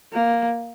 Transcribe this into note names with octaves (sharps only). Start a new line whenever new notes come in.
A#3